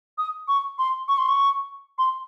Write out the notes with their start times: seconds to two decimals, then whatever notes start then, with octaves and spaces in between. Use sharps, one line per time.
0.18 D#6
0.48 C#6
0.79 C6
1.08 C#6
1.18 C6
1.28 C#6
1.98 C6